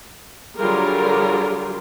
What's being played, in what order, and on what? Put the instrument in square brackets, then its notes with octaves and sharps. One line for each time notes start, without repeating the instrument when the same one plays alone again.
[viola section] D3 F#3 G3 F4 G#4 A#4